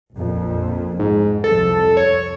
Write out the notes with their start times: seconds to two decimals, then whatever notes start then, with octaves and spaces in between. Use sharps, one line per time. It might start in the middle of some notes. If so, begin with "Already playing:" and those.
0.15 A#1 F2 A#2
0.99 F2 G#2
1.44 C2 F2 C3 A4
1.97 C#5